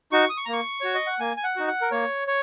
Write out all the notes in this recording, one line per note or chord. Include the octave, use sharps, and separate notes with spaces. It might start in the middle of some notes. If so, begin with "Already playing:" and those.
D#4 F#4 C#6
D#6
C#6
A#5
A#3 C#6
F#4 C#5
D#5
F#5
A#3 G#5
G#5
F#5
D#4 F#4
F#5
A#4
A#3 C#5
C#5